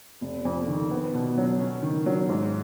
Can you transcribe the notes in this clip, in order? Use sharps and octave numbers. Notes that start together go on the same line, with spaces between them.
F1
F2
D#3
B3
B2
F#3
C#4
D#3
F#3
G#2